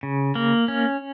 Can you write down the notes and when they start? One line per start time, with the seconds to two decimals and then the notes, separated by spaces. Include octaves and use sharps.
0.03 C#3
0.35 A#3
0.68 C#4